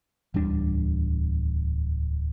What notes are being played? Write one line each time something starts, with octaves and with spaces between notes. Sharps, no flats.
D1 E2 G3 D4